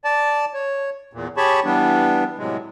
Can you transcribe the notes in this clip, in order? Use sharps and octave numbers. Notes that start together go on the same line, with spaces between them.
D5 A5
C#5
E2 A#2
G4 G#4 C#5 A5 B5 C#6
E3 G3 B3 D4
A2 C3 F#3 G#3